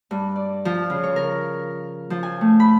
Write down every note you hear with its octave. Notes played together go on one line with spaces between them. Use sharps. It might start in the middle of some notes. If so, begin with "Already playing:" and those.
G2
D5
F3
C#3
C#5
A#4
F3
G#5
A3
B5